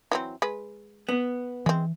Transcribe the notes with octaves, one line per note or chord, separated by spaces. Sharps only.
E3 F#3 C4
G#3 B4
B3
E3 G#3 C4